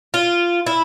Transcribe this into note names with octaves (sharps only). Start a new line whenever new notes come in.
F4
E4